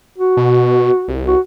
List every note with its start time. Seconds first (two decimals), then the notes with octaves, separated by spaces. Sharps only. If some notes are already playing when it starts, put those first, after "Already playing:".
0.18 F#4
0.37 B2
1.08 C2
1.27 F#4